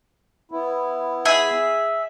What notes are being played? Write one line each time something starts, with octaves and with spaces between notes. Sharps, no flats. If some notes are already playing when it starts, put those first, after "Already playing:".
B3 E4
G#4 E5